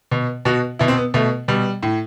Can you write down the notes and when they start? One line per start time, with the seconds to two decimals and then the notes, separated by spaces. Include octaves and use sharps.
0.11 B2
0.45 B2 F#4
0.79 B2 E4
0.88 C4
0.97 B3
1.14 B2 A3
1.48 B2 G3
1.83 A2